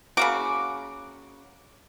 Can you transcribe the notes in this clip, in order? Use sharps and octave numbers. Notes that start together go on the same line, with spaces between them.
C#3 A#3 F#4 D6